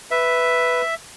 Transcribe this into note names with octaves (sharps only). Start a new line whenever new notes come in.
B4 E5